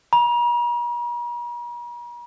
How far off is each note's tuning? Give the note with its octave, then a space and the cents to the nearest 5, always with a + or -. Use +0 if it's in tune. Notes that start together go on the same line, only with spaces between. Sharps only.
A#5 +45